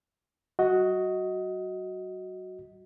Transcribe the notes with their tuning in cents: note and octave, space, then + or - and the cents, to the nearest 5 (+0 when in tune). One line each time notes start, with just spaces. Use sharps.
F#3 +35 F#4 +0 D#5 +20